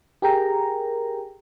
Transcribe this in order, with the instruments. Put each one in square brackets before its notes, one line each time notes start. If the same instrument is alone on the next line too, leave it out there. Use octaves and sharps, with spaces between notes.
[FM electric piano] G4 G#4 A#4 G5 A#5